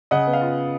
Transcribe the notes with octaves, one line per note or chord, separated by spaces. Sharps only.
C#3 D#5 F#5
B3
F5
F4